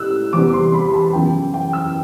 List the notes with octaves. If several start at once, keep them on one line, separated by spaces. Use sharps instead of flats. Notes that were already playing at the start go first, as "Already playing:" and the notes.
Already playing: A2 G3 E6 F#6
E2 C3 G3 B3 D6
C6
B5
B5
A5
F#2 E3 B3 G5
G5
E6